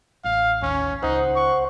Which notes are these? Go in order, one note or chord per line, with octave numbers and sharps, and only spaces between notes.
A1 F5
D#2 C#4
C#2 D#4 C5 F#5
C#6